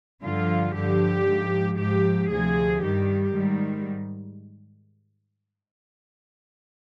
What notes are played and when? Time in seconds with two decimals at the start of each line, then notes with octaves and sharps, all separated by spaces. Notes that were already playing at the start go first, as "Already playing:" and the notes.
0.22 G2 D3 F3 F4
0.75 G2 D3 F3 G4
1.26 G#2 F3
1.79 G#2 F3 G4
2.30 D2 C3 F3 G#4
2.83 G2 D#3 G3 G4
3.35 G#2 D#3 G3